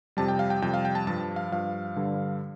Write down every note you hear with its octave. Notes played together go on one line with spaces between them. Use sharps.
F2 C3 G3 A5
G5
F5
G5
F2 C3 G3 G5
F5
G5
A5
G2 F3 A5
F5
G2 F3 F5
G2 D3 G3